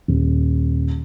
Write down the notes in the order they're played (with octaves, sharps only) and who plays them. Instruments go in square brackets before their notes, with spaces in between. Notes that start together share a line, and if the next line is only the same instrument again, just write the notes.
[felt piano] D#1